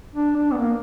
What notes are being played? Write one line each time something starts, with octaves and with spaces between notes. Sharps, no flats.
D4
D4
B3
A#3